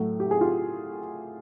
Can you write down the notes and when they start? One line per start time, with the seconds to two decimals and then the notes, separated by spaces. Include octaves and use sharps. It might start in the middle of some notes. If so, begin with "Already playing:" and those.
Already playing: A2 F#3 A3
0.20 G4
0.31 G#4
0.41 F4 G4